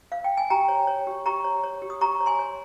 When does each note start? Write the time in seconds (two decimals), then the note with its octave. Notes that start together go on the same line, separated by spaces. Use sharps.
0.12 F5
0.24 G5
0.37 G#5
0.50 G4 G5 A#5
0.68 C#5
0.87 C#5
1.07 G4
1.26 G4 A#5 C#6
1.44 C#5
1.63 C#5
1.82 G4
1.90 D#6
2.01 G4 A#5 C#6
2.20 C#5
2.26 G#5 C6
2.39 C#5